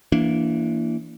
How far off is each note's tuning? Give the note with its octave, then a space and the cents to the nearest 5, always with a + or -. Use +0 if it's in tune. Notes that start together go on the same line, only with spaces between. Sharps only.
E3 +10 A#3 +0 D4 -20